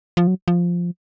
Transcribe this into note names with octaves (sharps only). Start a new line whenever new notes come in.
F3
F#3
F3